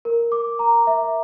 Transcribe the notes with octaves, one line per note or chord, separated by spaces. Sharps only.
A#4
D6
A#5
E5